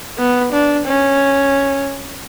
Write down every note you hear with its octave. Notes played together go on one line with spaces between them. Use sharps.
B3
D4
C#4